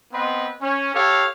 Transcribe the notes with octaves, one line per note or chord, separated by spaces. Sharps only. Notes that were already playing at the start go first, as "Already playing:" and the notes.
B3 C4 B4 D#5 C6
C#4
G4 A4 C#5 F5